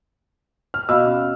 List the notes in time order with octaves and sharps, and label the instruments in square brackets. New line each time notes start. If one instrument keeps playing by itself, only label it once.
[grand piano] F6
[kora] B2 [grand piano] F5 B5 E6
[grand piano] C#4